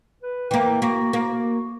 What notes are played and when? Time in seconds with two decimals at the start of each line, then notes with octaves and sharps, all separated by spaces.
0.23 B4
0.51 E3 A#3 G5
0.82 A#3 F#4
1.13 A#3